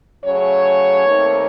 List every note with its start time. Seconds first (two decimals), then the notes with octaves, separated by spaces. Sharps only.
0.25 C#3 F#3 A3 C#4 C#5
1.05 D#2 D#3 A3 C4 D#4